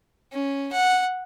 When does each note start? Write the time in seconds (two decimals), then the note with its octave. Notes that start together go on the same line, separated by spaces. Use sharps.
0.33 C#4
0.73 F#5